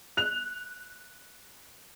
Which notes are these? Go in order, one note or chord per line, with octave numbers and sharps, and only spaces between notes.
F#6 F7